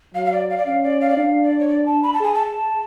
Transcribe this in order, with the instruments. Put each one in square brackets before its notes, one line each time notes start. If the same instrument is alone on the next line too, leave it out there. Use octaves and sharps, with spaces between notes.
[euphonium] F#3 [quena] F5
[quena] F5
D5
F5
D5
[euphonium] C#4 [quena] F5
[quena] D5
F5
D5
[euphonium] D4 [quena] F5
[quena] D5
C#5
D5
A5
B5
A5
[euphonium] G#4 [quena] G#5
[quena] A5